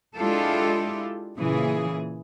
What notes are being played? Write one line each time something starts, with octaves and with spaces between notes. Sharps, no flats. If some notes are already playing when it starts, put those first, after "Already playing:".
G#3 D4 E4 F4 G4 A4
A#2 C#3 E3 G#4